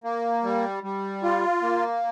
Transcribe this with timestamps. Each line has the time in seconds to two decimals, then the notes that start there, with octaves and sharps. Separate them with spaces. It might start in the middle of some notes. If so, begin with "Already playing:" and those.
0.04 A#3
0.44 G3
0.84 G3
1.23 F4
1.62 A#3